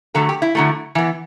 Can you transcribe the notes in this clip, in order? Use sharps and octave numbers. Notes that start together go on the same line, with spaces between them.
D3 F#3 A3 A4
G4
E4
D3 F#3 A3
E3 B3